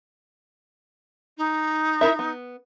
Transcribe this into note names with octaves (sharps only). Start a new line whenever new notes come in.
D#4
E4 A#4 E5
B3